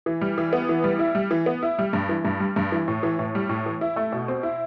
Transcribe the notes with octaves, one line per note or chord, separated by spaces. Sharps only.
E3
G3
E3
B3
E3
G3
E4
G3
E3
B3
E4
G3
G2
E3
G2
G3
G2
E3
A2
E3
A2
G3
A2
E3
E4
A3
B2
C4
E4